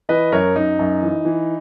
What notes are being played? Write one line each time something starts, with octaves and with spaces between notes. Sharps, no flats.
E3 B4 D#5
F#2 A#4 C#5
F#2 D#4
F#2
E3
E3